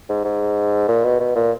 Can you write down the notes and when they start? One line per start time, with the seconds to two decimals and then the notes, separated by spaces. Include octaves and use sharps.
0.09 G#2
0.24 G#2
0.88 A#2
1.04 B2
1.20 B2
1.36 A#2